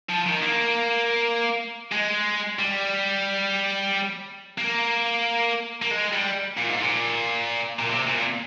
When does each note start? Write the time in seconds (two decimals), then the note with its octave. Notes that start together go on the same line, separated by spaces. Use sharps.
0.09 F3
0.26 D#3
0.42 A#3
1.92 G#3
2.59 G3
4.58 A#3
5.82 A#3
5.91 G#3
6.13 G3
6.57 A#2
6.69 G#2
6.82 A#2
7.79 A#2
7.90 C3
8.07 A#2
8.17 A#2